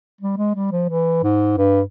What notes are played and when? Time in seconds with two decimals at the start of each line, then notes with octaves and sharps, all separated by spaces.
0.21 G3
0.38 G#3
0.55 G3
0.72 F3
0.89 E3
1.23 G#2
1.57 G2